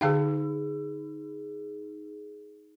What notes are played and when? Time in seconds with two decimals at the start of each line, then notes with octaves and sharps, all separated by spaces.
0.01 D3 D#4 G#4 F5 G5